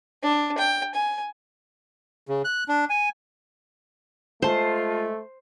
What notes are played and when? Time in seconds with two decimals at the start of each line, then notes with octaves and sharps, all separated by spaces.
0.23 D4
0.58 G5
0.95 G#5
2.27 C#3
2.45 F#6
2.68 D4
2.90 G#5
4.42 G#3 A3 F4 C5 A5